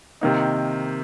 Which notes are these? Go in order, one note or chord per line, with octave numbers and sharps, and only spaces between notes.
C3 D#3 A#3 D#4